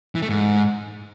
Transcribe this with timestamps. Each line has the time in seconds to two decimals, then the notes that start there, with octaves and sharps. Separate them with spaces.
0.15 E3
0.22 A3
0.29 G#2